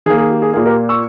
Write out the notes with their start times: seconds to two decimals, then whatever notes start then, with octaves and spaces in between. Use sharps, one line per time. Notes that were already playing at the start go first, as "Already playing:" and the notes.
0.06 D#3 G#4
0.10 A#3
0.18 G#4
0.30 G4
0.42 G#4
0.53 A#2 A#3 G#4
0.65 G4 A#4
0.89 C#6 E6